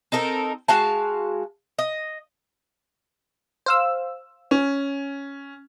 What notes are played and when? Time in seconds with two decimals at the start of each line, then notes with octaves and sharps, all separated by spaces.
0.12 C4 D#4 A4 A#4
0.68 G#3 F#4 F5 A5
1.79 D#5
3.66 C5 F5 E6
4.51 C#4